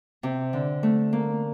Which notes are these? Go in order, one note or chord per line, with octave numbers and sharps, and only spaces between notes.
C3
D3
A3
A#3